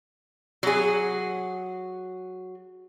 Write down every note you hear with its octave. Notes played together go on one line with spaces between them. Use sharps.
F#3 G#4